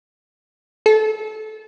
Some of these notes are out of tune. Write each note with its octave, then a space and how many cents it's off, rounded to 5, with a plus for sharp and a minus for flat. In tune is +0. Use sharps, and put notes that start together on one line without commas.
A4 -25